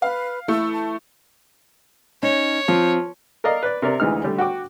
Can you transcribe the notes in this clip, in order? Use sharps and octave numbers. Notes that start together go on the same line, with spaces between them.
B4 F5
A3 E4 E6
A5
C#4 D#4 C#5
F3 C4
A#4 D5 D#5 F5 A#5
B4 D5
C3 A#4 D5
D2 E3 G#3 D#4 F6
D3 G3 A3
F#4 G5 D6